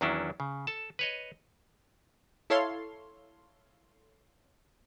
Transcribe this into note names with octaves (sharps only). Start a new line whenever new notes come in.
E2 D#3 F#3 C#4 D4 E4
C#3
A4 A5
B4 C#5 D#5
E4 A4 C#5 F5 C6